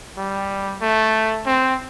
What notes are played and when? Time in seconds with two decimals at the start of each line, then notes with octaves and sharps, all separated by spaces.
0.17 G3
0.82 A3
1.46 C4